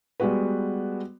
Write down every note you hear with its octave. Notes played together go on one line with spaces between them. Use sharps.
G3 G#3 B3 F#4 B4